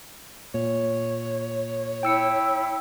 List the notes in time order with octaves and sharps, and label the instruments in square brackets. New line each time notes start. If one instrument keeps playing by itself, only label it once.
[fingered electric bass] A#2 [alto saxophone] C#5
[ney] E4 [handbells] G5 E6 C#7